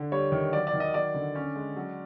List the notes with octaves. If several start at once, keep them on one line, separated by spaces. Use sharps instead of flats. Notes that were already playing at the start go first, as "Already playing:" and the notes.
Already playing: D3
G3 C#5
D#3
F#3 D5
D5
D#3
D#5
F#3 D5
D3
C#4
G#3
F#3